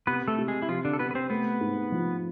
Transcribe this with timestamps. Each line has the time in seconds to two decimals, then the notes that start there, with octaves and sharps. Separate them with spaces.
0.07 C3 B3 B4
0.28 A3 A4
0.38 C3
0.48 G#3 G#4
0.62 E4
0.68 C3 F3 F4
0.85 D3 D4
0.93 A4
0.99 C3 B3 B4
1.11 B4
1.15 C4 C5
1.30 A3 B3 B4
1.61 G#2
1.92 F3